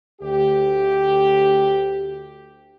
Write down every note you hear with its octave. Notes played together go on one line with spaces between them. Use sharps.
D2 G4